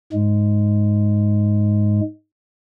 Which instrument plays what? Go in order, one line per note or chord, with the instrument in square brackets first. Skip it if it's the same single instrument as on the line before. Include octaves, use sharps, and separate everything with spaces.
[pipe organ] G#2 G#3